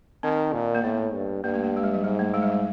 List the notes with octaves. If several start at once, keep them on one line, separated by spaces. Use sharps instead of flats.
D#3 C4
A#2
A#3
A2 B3
G2
G2 A#3
A3
A#3
G#3
G3
F#3
G#2 G3
A3
G#3
G3
G#3